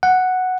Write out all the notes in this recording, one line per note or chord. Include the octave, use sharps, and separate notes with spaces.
F#5